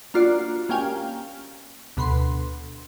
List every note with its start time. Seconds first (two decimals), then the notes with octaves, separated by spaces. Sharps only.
0.14 A#3 D4 F4 F#4 D5
0.69 A#3 C#4 G4 F5 G5 G#5
1.97 D2 B2 B5 C6